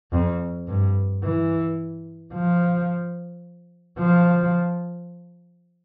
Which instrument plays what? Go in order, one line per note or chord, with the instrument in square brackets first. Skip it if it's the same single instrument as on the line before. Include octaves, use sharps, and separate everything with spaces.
[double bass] F2
G2
E3
F3
F3